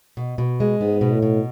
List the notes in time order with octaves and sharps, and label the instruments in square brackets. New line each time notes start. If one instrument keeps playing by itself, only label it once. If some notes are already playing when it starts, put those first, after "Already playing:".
[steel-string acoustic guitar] B2
B2
G#3
[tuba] G#2 [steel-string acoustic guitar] B3
[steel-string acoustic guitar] B2
[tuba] A2
[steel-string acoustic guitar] B2